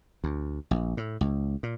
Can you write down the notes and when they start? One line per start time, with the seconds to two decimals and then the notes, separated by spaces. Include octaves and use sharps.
0.24 D2
0.71 A#1
0.97 A2
1.21 C#2
1.63 A#2